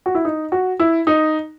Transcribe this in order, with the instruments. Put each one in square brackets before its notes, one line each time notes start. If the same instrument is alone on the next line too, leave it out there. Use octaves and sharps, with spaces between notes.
[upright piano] F#4
E4
D#4
F#4
E4
D#4